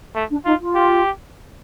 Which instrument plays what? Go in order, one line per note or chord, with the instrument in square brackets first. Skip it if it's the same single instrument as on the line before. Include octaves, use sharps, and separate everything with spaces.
[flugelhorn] A3
[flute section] D4
[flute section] D#4 [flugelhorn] F4
[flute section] F4
[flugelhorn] G4